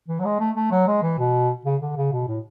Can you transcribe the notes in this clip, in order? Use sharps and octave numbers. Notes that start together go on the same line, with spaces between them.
E3
F#3
G#3
A3
A3
F#3
G#3
E3
B2
C#3
D3
C#3
B2
A2